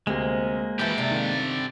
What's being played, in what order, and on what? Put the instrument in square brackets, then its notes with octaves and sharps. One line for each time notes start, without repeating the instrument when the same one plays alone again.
[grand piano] D2 C3 [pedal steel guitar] G#3 A#3 [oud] C4
[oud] E3 F#3 [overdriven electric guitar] G4 A4 [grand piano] E5 G6
[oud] C3 D4
[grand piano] D#3 F5